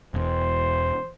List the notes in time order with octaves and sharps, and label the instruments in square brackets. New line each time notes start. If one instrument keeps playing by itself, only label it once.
[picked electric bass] E1 E2 E3 [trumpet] C5